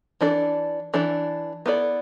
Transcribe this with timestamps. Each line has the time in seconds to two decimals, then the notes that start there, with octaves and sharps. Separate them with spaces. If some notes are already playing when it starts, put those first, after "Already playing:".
0.21 E3 D4 A4 D5
0.94 E3 D4 A4 D5
1.66 B3 E4 A4 D5